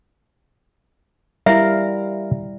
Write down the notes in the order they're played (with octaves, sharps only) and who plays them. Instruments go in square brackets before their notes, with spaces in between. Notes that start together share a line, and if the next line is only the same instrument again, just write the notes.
[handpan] G3 E4 [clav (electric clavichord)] A#4 F5 [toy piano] E5